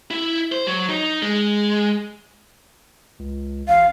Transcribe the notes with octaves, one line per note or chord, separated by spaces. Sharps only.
E4
C5
F#3
D#4
G#3
C#2
A1 F5